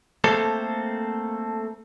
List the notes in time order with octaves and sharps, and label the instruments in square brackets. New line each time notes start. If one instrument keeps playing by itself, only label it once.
[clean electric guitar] A3 A#3 C4 A4 C5